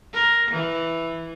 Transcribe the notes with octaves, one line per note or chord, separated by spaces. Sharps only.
A#4
E3